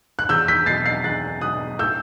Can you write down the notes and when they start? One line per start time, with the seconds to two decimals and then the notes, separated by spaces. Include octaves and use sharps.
0.19 F#6
0.29 E2 E6 G6
0.48 G6 B6
0.66 B2 F#3 A6 C7
0.85 A6 C7
1.04 E2 F#6 A6
1.41 B2 F#3 D#6 F#6
1.79 A2 E6 G6